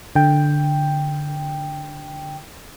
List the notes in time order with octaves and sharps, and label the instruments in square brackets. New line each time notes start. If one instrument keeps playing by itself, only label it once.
[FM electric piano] D3 G5